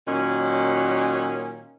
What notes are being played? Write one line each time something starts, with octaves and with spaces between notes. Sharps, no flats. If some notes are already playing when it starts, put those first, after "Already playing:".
A#2 D#3 F#3 C#4